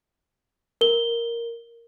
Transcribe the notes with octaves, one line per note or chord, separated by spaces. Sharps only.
A#4 G7